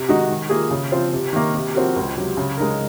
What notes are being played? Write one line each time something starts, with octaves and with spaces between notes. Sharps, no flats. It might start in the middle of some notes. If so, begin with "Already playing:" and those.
Already playing: C3
D#3 G#3 D#4 F#4
D#3
A#3 F4 G#4
C#3
F3 C4 F4
C3
D#3 A#3
C3
F3 C4 F#4 A#4
C#2
C3 F#3
C#3
G#3 D#4 A#4